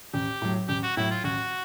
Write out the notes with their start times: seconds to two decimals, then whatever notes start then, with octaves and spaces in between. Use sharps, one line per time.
0.14 A1 G4
0.42 A2 F#3
0.69 A1 G4
0.83 F#4
0.97 A2 F#3 E4
1.11 F4
1.24 A1 F#4